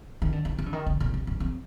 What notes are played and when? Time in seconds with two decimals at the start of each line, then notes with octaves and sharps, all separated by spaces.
0.22 D#3
0.32 D3
0.45 D#3
0.59 E3
0.66 D3
0.73 D#3
0.86 D3
1.00 A#2
1.14 A2
1.27 G2
1.40 F2